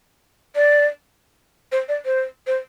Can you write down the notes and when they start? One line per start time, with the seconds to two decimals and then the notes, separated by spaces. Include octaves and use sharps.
0.56 D5
1.72 C5
1.89 D5
2.06 C5
2.47 C5